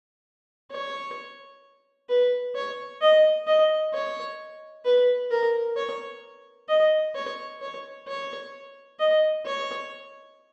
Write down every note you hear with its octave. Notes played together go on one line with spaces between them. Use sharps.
C#5
B4
C#5
D#5
D#5
C#5
B4
A#4
C#5
D#5
C#5
C#5
C#5
D#5
C#5